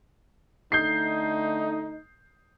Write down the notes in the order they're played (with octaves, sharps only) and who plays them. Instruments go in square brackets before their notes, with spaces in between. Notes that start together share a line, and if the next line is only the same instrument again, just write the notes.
[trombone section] D3 A3 D#4 [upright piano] G6 C7